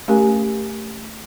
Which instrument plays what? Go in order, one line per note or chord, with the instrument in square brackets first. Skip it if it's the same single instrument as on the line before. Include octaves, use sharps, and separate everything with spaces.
[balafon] A3 C#4 G4 A#4 G#5